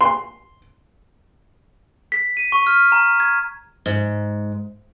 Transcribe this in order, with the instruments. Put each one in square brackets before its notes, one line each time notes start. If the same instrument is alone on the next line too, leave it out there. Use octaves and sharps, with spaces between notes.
[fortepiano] C6
[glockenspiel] B6
D#7
C#6
F6
A#5
G#6
[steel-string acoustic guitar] G#2